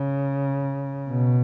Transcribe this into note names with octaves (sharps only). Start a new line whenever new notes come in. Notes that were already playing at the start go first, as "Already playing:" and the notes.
Already playing: C#3
B2